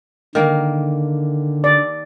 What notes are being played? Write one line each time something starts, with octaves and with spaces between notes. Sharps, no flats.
D3 D#3 A#3
D5